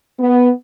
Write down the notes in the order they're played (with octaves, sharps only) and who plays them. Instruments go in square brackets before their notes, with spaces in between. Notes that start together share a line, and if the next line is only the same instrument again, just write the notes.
[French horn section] B3